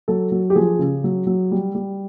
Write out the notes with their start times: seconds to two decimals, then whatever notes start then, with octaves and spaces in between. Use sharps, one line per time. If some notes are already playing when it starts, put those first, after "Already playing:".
0.08 F#3 A4
0.32 F#3
0.50 G4
0.55 F3 G#4
0.79 C#3
1.04 F#3
1.27 F#3
1.51 G3
1.75 G3